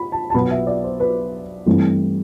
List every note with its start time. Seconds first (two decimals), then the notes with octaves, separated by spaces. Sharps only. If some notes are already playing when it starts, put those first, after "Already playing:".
Already playing: B5
0.12 A5
0.30 A5
0.34 B1 B2 B3 B5
0.51 E5
0.67 D5
0.84 C5
1.00 B4
1.66 G2 E3 A3 C4